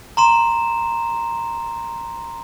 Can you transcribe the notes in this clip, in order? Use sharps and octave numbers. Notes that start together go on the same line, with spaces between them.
A#5 C6 E7